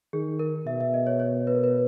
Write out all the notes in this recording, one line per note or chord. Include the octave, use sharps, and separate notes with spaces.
D#3 G#4
A#4
B2 E5
E5
D#5
C#5
C#5
B4
A#4
B4